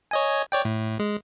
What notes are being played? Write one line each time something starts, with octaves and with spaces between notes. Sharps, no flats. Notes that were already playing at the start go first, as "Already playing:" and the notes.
C#5 D#5 G#5
C#5 D5 G5
A2
G#3